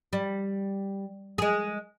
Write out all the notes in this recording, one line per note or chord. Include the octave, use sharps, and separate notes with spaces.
G3
G#3 G#4